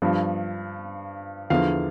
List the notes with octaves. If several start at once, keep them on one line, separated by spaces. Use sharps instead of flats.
G2 F3
E2 D3 F3 F5